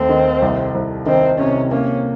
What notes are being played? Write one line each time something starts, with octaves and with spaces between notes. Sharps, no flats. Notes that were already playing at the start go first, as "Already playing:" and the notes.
Already playing: D#2 A3 C4
D#3
C2
C2
D#3 C4
C3 C#4
A#3 C#4